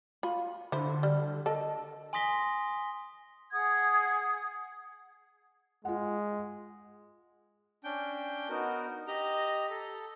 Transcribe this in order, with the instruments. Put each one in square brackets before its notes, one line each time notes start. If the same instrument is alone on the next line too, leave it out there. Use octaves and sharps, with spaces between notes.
[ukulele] F4 [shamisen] B5
[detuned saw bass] D3 [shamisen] E4 C5
[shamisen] G3
[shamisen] A4 [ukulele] A#4 D#5 A5
[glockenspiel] G#5 C6 D#6 A#6 B6 G7
[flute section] G#4 F#5 D#6 G#6
[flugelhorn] G#3 [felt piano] F4 F#5
[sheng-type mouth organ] C#4 D4 G5 G6
B3 D#4 F#4 A#4
G4 D#5 A#5
A4